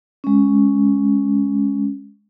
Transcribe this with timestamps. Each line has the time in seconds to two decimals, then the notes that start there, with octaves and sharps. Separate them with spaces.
0.24 G#3 C#4